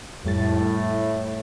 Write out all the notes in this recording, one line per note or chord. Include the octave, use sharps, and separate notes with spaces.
F2 A2 G3 A6